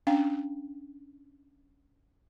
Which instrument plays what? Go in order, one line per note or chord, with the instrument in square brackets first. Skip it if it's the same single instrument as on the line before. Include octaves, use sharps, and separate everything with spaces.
[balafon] C#4 D4 F5 G5